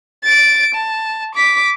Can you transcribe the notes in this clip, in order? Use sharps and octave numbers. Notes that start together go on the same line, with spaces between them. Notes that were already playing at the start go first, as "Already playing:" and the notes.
A6 D7
A5
D6 B6